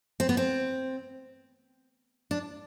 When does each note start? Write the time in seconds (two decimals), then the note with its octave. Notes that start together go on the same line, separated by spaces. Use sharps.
0.20 C4
0.29 B3
0.37 C4
2.31 D4